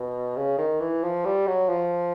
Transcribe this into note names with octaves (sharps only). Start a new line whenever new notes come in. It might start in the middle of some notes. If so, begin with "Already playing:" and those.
Already playing: B2
C#3
D#3
E3
F3
G3
F#3
F3